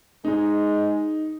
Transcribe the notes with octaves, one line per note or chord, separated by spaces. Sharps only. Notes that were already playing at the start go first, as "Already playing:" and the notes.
G#3 D#4